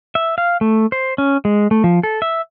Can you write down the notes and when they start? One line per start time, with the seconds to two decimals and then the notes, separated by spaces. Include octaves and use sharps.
0.15 E5
0.38 F5
0.61 A3
0.92 C5
1.18 C#4
1.45 G#3
1.71 A3
1.84 F3
2.03 A4
2.22 E5